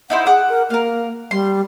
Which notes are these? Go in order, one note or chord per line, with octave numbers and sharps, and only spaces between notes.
D#4 E4 C5 F#5
G#4 F#5 D6
A#4
A#3 A#4 F5
G3 C6